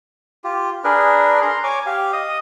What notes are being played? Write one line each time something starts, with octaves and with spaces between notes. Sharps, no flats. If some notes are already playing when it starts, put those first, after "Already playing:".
F4 G4
D4 G#4 A#4 B4
A#5 C6
C#5 G#5 D6
G4 F5
D#5 D#6